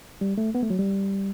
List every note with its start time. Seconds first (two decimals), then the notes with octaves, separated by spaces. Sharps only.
0.21 G3
0.38 A3
0.55 B3
0.63 A3
0.70 F#3
0.79 G3